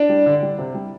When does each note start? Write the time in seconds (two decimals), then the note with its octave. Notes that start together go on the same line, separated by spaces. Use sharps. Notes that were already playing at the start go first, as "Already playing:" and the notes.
Already playing: D4 D5
0.09 G3
0.26 D3
0.42 G3
0.58 C3
0.75 G3